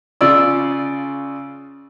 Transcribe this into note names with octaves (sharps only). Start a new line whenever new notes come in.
C#3 F4 D5 E6